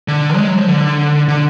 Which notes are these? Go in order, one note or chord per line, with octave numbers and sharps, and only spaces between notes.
D3
G#3
F#3
F3
D3
D3